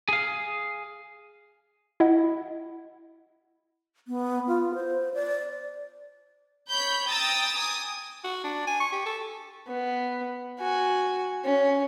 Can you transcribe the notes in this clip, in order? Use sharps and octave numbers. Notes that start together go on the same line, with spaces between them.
G#4 F5
E4 D#5 F#5
B3
F4
C5
D5
C#5 B5 G6
G5 A#5 D#6 E6 A6
G#5 D6 D#6
F#4
D4
G#5
C#6
G4
A4
B3
F#4 G#5
C#4